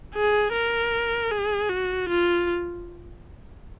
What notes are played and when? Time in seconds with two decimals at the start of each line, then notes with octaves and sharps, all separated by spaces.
0.15 G#4
0.53 A#4
1.31 G#4
1.70 F#4
2.09 F4